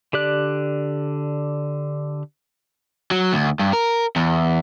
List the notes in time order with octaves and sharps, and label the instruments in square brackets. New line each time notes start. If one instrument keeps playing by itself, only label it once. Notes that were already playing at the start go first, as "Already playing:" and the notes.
[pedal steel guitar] D3 G4 D5 F#6
[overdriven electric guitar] F#3
D2
G2
A#4
E2